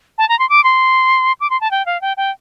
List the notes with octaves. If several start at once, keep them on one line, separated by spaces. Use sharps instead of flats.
A5
A#5
C6
D6
C6
D6
C6
A5
G5
F5
G5
G5